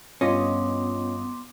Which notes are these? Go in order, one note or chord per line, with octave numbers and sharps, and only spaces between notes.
G2 B3 C#4 F4 D#5 C6 D6